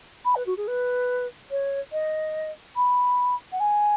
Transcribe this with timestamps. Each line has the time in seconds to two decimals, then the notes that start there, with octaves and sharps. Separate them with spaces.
0.24 B5
0.35 B4
0.46 F#4
0.57 G#4
0.67 B4
1.50 C#5
1.92 D#5
2.76 B5
3.52 F#5
3.59 G#5